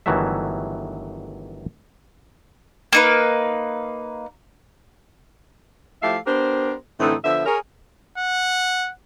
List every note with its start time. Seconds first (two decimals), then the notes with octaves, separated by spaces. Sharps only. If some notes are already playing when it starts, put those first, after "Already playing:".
0.06 G1 D#3 E3 F#3 A3 E5
2.93 A#3 D#4 B4
6.02 F3 A3 E4 G4 E5 F5
6.26 B3 D4 G4 A#4 C5
7.00 A2 D3 E3 A3 C4 D#4
7.24 D3 F3 B3 E5
7.46 G#4 A#4 C#5
8.18 F#5